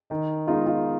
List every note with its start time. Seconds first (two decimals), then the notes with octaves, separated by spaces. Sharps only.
0.10 D#3 D#5
0.48 G#3 B3 D#4 F4
0.67 F4